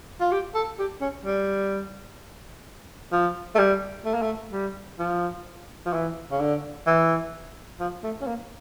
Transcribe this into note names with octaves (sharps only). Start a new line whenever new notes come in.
F4
G4
A4
G4
C#4
G3
F3
A3
G3
A3
A#3
A3
G3
F3
F3
E3
C#3
D3
E3
F3
A3
C#4
A#3